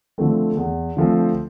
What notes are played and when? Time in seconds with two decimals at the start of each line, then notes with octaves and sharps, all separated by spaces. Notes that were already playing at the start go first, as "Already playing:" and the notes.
0.18 D3 F3 A3 C4
0.57 E2
0.97 D3 F3 A3 C4